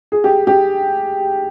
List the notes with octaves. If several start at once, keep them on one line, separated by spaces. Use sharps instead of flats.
G#4
G4
G4